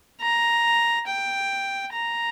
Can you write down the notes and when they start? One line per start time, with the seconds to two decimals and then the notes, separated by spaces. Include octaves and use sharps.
0.21 A#5
1.07 G5
1.93 A#5